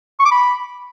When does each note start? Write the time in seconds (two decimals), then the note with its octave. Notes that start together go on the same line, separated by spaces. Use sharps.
0.20 C#6
0.25 D6
0.31 B5